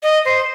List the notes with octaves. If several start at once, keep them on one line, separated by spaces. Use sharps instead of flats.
D#5
C5